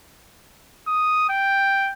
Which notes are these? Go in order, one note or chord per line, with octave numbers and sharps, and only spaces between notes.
D#6
G5